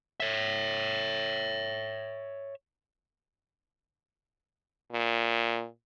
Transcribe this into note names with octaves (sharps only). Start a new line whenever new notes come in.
C#5 E5
A#2